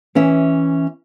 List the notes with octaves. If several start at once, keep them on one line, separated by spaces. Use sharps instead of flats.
E3 C#4 E5